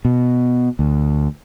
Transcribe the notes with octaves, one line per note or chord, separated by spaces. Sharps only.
B2
D2